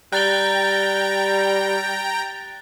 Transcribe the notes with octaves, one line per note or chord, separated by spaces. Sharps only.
G3 G5 A#5 F#6 A6 G7